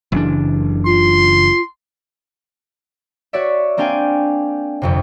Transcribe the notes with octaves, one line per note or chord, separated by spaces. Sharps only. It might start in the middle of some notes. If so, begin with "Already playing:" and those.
F#1 F#2 C#3 E3 D4
F4 C6
F#4 C#5 D5 E5
A#3 C4 D4 F5 G5 G#5
G1 F2 C3